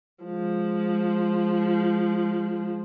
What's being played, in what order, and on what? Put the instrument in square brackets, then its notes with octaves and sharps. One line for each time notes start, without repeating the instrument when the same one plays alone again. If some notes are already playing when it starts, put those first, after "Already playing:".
[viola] F3 G#3